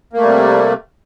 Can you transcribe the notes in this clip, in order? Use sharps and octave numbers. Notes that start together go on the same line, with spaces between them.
C3 G3 A3 A#3